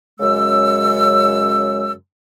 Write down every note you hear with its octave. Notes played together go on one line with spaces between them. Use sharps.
F#2 C#3 G#3 E6